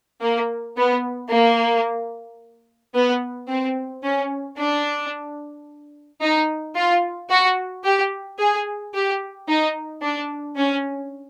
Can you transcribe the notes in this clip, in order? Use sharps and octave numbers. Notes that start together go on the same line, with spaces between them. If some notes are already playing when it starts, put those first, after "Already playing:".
A#3
B3
A#3
B3
C4
C#4
D4
D#4
F4
F#4
G4
G#4
G4
D#4
D4
C#4